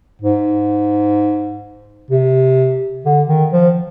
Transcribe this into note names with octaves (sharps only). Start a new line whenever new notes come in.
G#2
C3
D3
D#3
F3